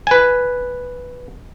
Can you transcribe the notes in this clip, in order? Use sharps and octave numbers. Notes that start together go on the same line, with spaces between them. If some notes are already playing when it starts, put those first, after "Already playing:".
B4 G#5